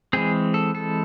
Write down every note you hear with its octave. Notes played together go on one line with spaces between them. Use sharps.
E3 G#3 C4 G#4
A4
A4